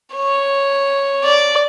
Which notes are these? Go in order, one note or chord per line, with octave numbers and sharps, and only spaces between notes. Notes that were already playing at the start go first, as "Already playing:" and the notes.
C#5
D5